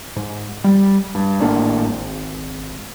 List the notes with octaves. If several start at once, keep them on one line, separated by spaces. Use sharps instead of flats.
G#2
G3
G2
G#1 A2 A#3 D4
G#1